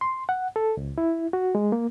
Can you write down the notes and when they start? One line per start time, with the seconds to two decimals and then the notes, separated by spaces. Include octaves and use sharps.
0.01 C6
0.29 F#5
0.56 A4
0.77 C#2
0.98 E4
1.33 F#4
1.55 G#3
1.72 A#3